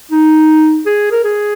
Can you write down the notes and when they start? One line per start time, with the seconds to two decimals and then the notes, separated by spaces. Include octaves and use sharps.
0.11 D#4
0.86 G#4
1.11 A#4
1.24 G#4